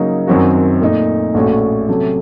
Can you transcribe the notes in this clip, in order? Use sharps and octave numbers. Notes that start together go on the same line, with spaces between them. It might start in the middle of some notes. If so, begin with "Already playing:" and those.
Already playing: C#3 F#3 A#3 D#4
F#2 D#3 F#3 C4 F#4
A#2 A3 D#4
A#1 A2 A3 C#4 F#4
C3 F#3 A3 C#4 A4